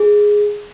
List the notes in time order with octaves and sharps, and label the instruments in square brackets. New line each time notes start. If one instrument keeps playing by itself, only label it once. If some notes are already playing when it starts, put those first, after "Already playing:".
Already playing: [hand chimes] G#4